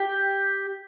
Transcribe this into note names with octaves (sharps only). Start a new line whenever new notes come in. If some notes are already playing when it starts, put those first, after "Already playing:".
Already playing: G4